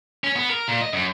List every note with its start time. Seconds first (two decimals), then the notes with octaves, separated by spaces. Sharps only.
0.24 C#4
0.36 B3
0.50 A#4
0.68 A#2
0.81 D#5
0.93 F#2